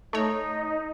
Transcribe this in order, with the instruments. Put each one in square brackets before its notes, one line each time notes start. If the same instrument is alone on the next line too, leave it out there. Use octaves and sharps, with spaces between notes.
[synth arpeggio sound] A3 C#5 [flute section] D#4 D#5